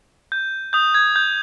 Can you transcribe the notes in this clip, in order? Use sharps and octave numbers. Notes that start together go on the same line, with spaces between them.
G6
D#6 G6
G#6
G6